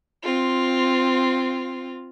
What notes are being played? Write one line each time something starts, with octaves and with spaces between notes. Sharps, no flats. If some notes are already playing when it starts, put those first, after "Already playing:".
C4 F4